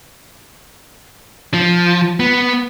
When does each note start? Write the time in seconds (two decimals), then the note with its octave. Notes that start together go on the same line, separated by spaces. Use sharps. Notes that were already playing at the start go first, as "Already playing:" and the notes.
1.54 F3
2.20 B3